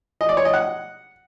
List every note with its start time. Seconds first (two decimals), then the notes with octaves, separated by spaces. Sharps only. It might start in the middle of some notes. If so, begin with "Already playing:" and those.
0.21 D#5
0.29 D5
0.37 C#5
0.45 D#5
0.53 F#5